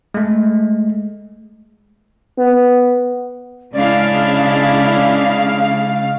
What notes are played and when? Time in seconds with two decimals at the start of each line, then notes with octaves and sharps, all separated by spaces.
0.14 G#3 A3
2.38 B3
3.75 C#3 G#3 C#4 D4 E4 D5 F5